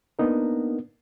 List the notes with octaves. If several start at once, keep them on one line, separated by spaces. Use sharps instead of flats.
A#3 B3 D4 D#4 A#4